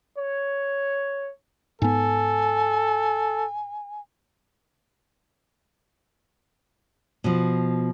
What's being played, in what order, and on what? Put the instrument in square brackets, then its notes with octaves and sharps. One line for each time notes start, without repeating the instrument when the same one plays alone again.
[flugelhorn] C#5
[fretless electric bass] G#2 B3 [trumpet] A4 [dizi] G#5
[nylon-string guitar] B2 F3